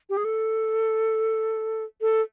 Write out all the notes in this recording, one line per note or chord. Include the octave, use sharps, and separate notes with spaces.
G4
G#4
A4
A4